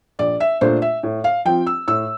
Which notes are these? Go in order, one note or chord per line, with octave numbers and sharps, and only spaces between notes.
A#1 D5
E5
A#2 A3 D4 F4 C5
E5
A2
F5
F3 C4 F4 G5
E6
A2 E6